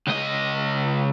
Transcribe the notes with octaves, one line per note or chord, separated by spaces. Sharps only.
C#2 D#5